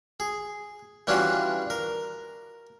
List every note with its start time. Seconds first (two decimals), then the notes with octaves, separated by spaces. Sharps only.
0.20 G#4
1.07 E3 G3 C#4 D4 F4 F#4
1.70 A#4